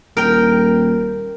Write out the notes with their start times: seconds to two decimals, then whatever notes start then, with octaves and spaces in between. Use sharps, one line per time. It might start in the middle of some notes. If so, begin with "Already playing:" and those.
0.17 D#1 A#4 G5